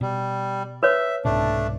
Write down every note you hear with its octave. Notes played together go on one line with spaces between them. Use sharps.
B2 G3
B4 C#5 E5
C2 G#2 B2 A3 D4